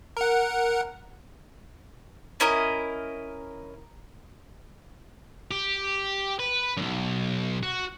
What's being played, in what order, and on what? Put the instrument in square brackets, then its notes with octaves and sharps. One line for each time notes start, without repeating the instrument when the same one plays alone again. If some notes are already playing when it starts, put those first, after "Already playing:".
[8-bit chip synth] A#4 F#5
[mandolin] C#4 E4 A#4 D#5
[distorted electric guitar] G4
B4
B1 F#2
F#4